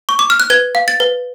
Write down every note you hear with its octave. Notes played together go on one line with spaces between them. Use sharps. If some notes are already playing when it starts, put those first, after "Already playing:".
C#6
D6
F6
F#6
B4 G#6
F5
A6
B4